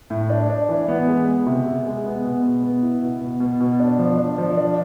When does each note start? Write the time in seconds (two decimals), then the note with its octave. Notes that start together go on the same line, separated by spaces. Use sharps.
0.10 A2
0.30 D4
0.50 D4
0.69 E3
0.88 B3
1.08 G#3
1.28 B3
1.47 C3
1.66 C3
1.86 G#3
2.05 B3
2.24 B2
2.43 B3
2.63 B3
2.82 E4
3.02 B2
3.21 B2
3.40 B2
3.61 B2
3.80 D4
3.99 F3
4.18 D4
4.38 F3
4.57 D4